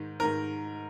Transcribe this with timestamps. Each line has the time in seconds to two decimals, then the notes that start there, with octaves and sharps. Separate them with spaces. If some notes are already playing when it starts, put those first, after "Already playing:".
Already playing: G#2 D#3
0.20 G#2 D#3 A#4